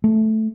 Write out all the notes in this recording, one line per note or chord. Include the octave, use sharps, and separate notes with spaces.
A3